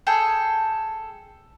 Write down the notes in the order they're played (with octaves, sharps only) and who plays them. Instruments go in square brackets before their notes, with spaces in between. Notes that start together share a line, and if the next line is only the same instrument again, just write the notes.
[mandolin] G#4 A4 G5